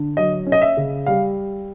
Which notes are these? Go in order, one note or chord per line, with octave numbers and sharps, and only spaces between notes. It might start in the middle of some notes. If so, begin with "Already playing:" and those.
Already playing: D3
F#3 D#5
C#4
D#5
E5
C#3
G3 F5